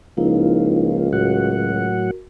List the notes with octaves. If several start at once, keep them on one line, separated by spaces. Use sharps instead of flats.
C#2 F3 A#3 D#4 E4
A2 F#3 F#4 A#4 F#5